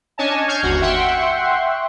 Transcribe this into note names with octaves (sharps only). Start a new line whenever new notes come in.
C#4 D4 C#5 D#5 G#5 A5
C#6 F6 G6 G#6 C7
G1 D#2 F#4
E5 F#5 G5 C6 C#6